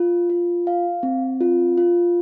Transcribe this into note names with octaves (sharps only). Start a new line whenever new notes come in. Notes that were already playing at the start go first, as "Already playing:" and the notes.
Already playing: F4
F4
F5
C4
F4
F4